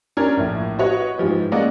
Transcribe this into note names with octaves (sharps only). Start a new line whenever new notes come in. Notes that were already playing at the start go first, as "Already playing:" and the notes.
C#4 D4 A#4 F6 G#6
A#1 A2
F#4 B4 C#5 D#5 F#5
G#2 E3 F3 G4
G#3 A#3 C#4 D5 D#5 F#5